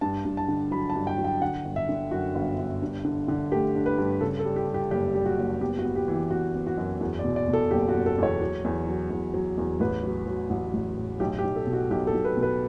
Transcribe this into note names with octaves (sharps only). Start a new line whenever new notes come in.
G2 A5
G2
A5
D3
F#3 B5
A5
G2
G5
F#3
G5
D3 F#5
G1
E5
D3
F#2 F#4
G1
G1
G2
D3
D3
A3 G4
D4
B4
G2
C#3 A4
A4
G3
G4
G3
G4
F#1 G4
G3
F#4
F#1
B3 G4
F#4
B3
G4
E3
G4
B3 F#4
B3
F#4
F#2
E2 F#4
D5
B2
D5
B2
A4
F#1 G4
F#4
F#1
A4
E2 C#5
F#3
E2
F#3
E2
F#3
E2
A1 B4
F#3
F#3
A1
A1
A2
B1 G4
G4
B1
A4
B2
F#4
B1 G4
A4
B1
B4
B2
B4